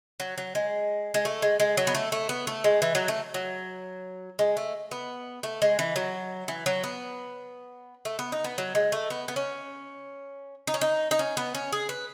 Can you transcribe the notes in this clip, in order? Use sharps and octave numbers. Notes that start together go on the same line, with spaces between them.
F#3
F#3
G#3
G#3
A3
G#3
G#3
F#3
B3
A3
A3
B3
A3
G#3
E3
F#3
A3
F#3
G#3
A3
B3
A3
G#3
E3
F#3
E3
F#3
B3
A3
B3
D#4
B3
F#3
G#3
A3
B3
B3
C#4
D#4
C#4
D#4
D#4
C#4
B3
C#4
G#4
B4